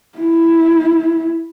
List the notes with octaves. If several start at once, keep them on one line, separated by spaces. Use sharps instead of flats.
E4